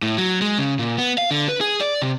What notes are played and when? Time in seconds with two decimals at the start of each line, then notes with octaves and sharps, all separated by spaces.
0.02 A2
0.18 F#3
0.41 G#3
0.58 C#3
0.79 A#2
0.98 B3
1.18 F5
1.31 D3
1.49 B4
1.61 G#4
1.81 D5
2.02 C3